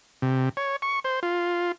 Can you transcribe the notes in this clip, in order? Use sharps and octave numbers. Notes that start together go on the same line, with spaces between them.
C3
C#5
C#6
C5
F4